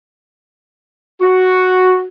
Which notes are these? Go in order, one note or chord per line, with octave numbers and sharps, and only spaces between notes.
F#4